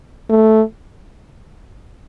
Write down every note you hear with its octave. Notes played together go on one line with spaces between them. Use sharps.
A3